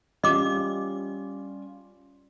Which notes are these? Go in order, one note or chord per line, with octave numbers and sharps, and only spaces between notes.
G3 C#4 F4 D#5 D6